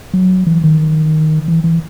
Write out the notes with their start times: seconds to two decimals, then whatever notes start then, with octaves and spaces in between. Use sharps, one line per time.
0.14 F#3
0.47 E3
0.64 D#3
1.48 E3
1.64 E3